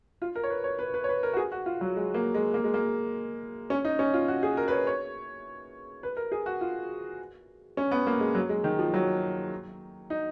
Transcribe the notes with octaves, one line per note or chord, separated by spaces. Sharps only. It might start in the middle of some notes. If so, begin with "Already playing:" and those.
F4
A#4
C#5
B4
C#5
B4
B4
C#5
B4
A#4
F#4
G#4
F#4
F4
F#3
G#3
A#3
G#3
A#3
G#3
A#3
C#4
D#4
C#4
F4
F#4
G#4
A#4
B4
C#5
C#5
B4
A#4
G#4
F#4
F4
C#4
B3
A#3
G#3
F#3
G#3
D#3
F3
F#3
D#4